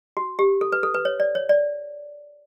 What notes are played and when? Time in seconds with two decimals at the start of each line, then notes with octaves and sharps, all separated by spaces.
0.17 F#4
0.39 G4
0.61 A4
0.72 B4
0.83 A4
0.94 B4
1.05 C#5
1.20 D5
1.35 C#5
1.49 D5